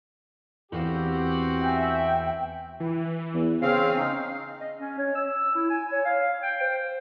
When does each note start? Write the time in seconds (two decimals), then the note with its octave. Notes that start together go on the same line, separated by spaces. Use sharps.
0.72 E2 C4 F#4 G4 F5 E7
1.62 E5 G5 G#5 G6
2.80 E3
3.34 E2
3.62 C#3 C4 C#4 F5
3.98 D#4
4.60 D#5
4.78 C#4
4.98 C#5
5.16 E6
5.55 E4
5.70 G#5
5.92 C#5
6.05 F5
6.43 G5
6.61 C5